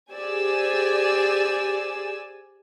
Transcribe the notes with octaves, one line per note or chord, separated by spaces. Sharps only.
G4 G#4 C5 D5 G#5 E6